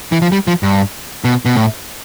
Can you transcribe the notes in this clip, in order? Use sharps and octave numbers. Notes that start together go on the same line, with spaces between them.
E3
F3
G3
F3
G2
B2
B2
A2